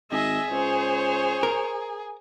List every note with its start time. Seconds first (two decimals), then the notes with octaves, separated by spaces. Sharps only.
0.12 G#1 G#4 D#5 E5
0.50 C#2 C5 C#5
1.43 A#4